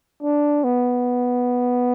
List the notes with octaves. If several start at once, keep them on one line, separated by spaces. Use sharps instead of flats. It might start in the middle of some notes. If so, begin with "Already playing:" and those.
D4
B3